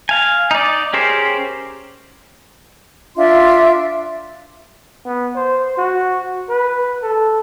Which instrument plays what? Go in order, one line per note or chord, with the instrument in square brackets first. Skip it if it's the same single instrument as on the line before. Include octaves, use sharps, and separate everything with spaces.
[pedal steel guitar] F5 G#5
D#4 D5
C#4 G4 G#4 A#4 C5
[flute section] D4 F4 E5 C6
[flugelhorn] B3
C5
F#4
B4
A4